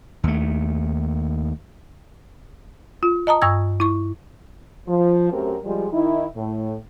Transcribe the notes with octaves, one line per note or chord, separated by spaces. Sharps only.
D#2 A3
F4
D#5 A5 A#5 D#6
G2 C#6 D#6 E6 G#6
E4 C#6
F3
F#2 A3 C4 G4 A#4
F3 G3 G#3
D#3 D#4 E4
A2